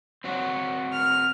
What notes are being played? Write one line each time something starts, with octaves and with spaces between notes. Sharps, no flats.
C4 F#4 C#5
F6